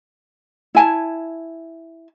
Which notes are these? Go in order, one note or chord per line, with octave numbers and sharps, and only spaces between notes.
E4 G#5 A5